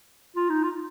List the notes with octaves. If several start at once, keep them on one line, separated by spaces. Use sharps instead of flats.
F4
D#4
F4